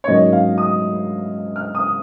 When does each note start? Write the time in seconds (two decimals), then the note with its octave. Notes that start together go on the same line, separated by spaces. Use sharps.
0.04 C#5
0.08 G#2 F#3 A#3 C#4 D#5
0.33 F5
0.58 D#6
1.56 F6
1.75 D#6